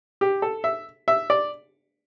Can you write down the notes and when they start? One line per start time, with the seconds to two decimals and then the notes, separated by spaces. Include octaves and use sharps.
0.21 G4
0.42 A4
0.64 E5
1.08 E5
1.30 D5